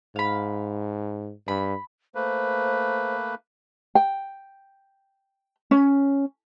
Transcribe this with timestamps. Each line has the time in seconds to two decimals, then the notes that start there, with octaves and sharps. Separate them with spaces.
0.16 G#2 F5 B5
1.48 G2 B5
2.15 A3 A#3 B4 C5
3.95 G5
5.71 C#4